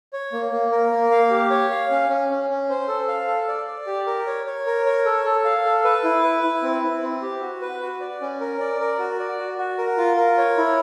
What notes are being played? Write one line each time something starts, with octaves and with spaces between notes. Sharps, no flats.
C#5
A#3
A#3
A#4
A#3
F5
G4
C#5
F5
C#4
C#4
C#4
C#4
C5
A4
F5
A4
D5
D5
G4
A#4
C#5
C#5
A#4
C#5
A4
A4
F5
A4
B4
E4
B4
E4
C4
E4
C4
G4
F#4
B4
F#4
D5
C#4
A#4
D5
A#4
F#4
D5
F#4
F#4
A#4
F4
A#4
C#5
E4